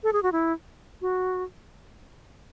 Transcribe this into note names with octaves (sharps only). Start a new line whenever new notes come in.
A4
G#4
F#4
E4
F#4